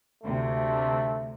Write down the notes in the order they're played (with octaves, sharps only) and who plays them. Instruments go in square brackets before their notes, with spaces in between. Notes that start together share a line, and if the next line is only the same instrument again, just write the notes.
[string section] D2 C3 [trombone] A3